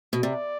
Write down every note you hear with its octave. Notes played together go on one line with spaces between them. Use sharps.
B2
C3 D5